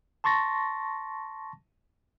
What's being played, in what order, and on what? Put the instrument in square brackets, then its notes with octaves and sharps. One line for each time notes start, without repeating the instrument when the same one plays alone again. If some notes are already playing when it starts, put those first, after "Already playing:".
[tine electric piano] A5 C6 C#6 A6 A#6